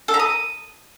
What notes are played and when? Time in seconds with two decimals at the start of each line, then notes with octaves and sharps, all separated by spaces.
0.08 A4
0.14 A#5
0.19 D#6